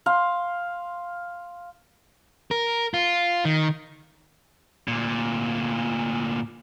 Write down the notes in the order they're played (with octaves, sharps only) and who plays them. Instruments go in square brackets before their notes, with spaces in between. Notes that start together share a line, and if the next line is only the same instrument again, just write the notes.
[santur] F5 C6
[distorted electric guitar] A#4
F4
D#3
[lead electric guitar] D2 A#2